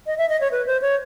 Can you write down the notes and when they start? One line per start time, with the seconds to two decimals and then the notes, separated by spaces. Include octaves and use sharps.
0.07 D#5
0.18 E5
0.29 D#5
0.41 C#5
0.51 B4
0.66 C5
0.82 C#5